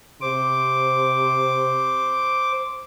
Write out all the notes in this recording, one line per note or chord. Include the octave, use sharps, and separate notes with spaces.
C3 C5 D6